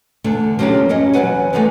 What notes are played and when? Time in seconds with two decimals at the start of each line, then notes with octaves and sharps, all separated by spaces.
0.24 E2 D3 A3
0.59 F3 F#3 A#3 C#4 D4 G4
0.89 G2 C#4 C#5 D#5
1.13 E2 F#3 A3 B4 F#5 G#5
1.53 C#3 E3 F3 G#3 A3 B3